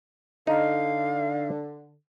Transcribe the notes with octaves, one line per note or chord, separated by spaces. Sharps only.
D3 D#4 F5